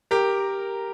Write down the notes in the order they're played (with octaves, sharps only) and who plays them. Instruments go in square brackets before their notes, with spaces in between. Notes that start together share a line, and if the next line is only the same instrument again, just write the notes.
[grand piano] G4 A#4